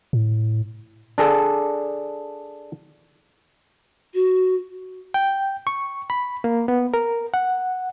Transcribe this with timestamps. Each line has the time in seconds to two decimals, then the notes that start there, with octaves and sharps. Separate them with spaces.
0.13 A2
1.18 D4 G#4 A4 D5
4.14 F#4
5.14 G5
5.67 C#6
6.10 B5
6.44 A#3
6.68 B3
6.94 A#4
7.34 F#5